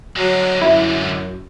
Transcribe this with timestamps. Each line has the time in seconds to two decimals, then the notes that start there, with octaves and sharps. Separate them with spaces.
0.16 D3 F#3 G#3
0.61 F#2 E4